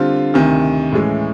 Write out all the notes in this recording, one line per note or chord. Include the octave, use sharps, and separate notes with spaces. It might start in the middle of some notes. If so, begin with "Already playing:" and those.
Already playing: D3 G3 C4 F4
D2 C3 D#3
A2 E3 G#3 C#4